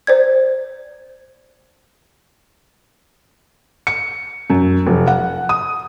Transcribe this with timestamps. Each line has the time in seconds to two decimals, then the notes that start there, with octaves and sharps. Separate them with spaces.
0.07 C5 D5 G#6
3.87 C#7
4.50 F#2
4.86 F1
5.07 F#5
5.49 D#6